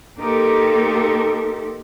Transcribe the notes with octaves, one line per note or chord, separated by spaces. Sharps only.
A#3 D#4 G4 A4 A#4 C5